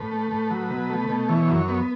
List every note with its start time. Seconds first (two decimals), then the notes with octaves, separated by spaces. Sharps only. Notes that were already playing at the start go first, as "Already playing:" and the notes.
Already playing: A2 B4
0.11 A3
0.31 A2
0.50 F#3
0.70 B2
0.89 A3
1.09 B2
1.29 E3 C#5
1.48 F#2
1.55 C#5
1.68 B3